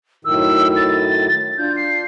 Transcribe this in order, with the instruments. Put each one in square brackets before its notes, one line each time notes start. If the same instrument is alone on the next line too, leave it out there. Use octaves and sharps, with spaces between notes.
[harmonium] F#2 A2 D#3 [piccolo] E6
[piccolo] A6
[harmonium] D4 F4 [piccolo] G6
[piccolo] C7